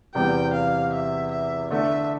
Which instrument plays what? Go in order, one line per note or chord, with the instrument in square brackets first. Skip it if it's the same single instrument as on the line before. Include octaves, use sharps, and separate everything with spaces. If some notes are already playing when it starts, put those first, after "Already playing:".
[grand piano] E2 C3 G3 B3 [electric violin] G5
[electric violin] F5
E5
E5
[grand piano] D3 A3 D4 A4 [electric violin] E5